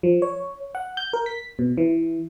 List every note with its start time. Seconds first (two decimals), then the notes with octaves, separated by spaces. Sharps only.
0.03 F3
0.22 C#5
0.75 F#5
0.97 G6
1.13 A#4
1.26 B6
1.59 B2
1.78 E3